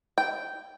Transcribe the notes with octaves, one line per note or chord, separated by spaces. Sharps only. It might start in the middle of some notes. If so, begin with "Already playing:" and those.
G5